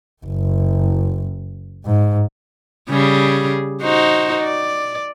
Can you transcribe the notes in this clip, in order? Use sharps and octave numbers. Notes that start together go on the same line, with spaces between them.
F#1
G#2
C#3 G3 G#4
D#4 F#4 C5
D5